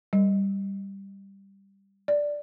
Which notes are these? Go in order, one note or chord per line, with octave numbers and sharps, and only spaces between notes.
G3
D5